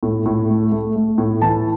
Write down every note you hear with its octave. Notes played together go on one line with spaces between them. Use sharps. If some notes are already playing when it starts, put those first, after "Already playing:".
A2
A2
A3
A3
A3
A2
E3 A5